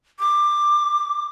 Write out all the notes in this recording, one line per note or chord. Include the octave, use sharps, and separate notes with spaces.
D6